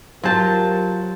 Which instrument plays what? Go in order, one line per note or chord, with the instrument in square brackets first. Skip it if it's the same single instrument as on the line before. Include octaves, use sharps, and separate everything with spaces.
[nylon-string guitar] F#3 A5 [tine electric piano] F4 C5 [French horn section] G4 A#4